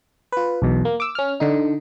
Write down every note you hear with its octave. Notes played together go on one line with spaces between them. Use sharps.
F4 B4
B1 E2 B2
A#3
D6 E6
C#4 F6
D3 D#4